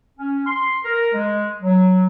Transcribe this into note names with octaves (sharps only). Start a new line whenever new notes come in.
C#4
C6
A#4
G#3
F#3